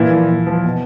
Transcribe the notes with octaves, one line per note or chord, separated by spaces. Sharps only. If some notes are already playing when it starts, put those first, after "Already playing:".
Already playing: A#2 E3 E4
F3
A#2
F3
B2